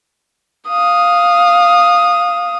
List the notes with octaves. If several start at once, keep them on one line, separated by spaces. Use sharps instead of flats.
F5 D#6